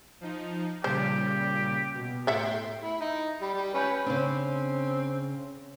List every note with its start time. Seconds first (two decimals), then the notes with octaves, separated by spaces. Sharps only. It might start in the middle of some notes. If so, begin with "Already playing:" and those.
0.21 F3 D#4
0.84 A#2 C#3 G3 G4 C5
1.94 B2
2.27 A2 A4 E5 F#5 G5 C6
2.84 E4
3.01 D#4
3.42 G3 B5
3.54 G3
3.74 C#4 B4 C#5 B5 G6
4.06 C#3 C4 D4